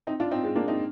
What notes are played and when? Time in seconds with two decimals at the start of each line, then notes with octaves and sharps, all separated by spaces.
0.07 C4 D#4
0.20 D4 F4
0.31 C4 D#4
0.43 G#3 C4
0.56 A#3 D4
0.68 C4 D#4